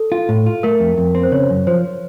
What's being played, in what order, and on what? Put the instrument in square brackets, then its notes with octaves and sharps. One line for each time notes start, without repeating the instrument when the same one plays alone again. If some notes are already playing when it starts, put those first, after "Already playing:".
Already playing: [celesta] A4
[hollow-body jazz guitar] F4
A2
F4
[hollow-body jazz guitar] A3 [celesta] A#4
[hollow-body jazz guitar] F2
F2
C4
[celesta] C5
[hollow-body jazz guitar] C#3 [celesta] C#5
[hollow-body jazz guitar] F#2
[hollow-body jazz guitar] F3 [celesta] C5